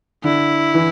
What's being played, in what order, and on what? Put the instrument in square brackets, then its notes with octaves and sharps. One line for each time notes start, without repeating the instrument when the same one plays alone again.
[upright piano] D3 [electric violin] E4
[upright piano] E3